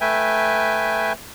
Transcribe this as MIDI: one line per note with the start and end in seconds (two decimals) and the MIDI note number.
0.01 1.13 57
0.01 1.13 71
0.01 1.13 76
0.01 1.13 79
0.01 1.13 80